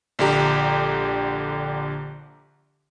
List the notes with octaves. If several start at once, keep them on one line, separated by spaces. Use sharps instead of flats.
A#1 D3 G4 A#5